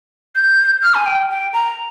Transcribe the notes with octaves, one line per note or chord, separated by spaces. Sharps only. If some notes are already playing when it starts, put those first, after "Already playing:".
G6
F6
G#5
G5
G5
A#5